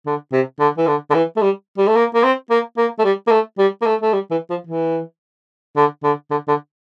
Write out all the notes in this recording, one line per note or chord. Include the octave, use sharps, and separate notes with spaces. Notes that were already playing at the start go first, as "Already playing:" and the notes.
D3
C3
D3
E3
D3
D3
E3
A3
G3
G3
A3
A#3
A#3
C4
A#3
A#3
A3
G3
A#3
A3
G3
A#3
A3
A3
G3
E3
F3
E3
D3
D3
D3
D3